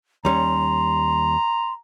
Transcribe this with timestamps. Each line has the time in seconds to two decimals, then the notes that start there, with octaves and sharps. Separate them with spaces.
0.25 D#2 G3 C#4 A#5 C6